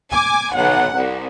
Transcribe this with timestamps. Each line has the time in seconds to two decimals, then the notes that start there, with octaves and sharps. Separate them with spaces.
0.11 G#5 D6
0.52 B1 F#5
0.96 C2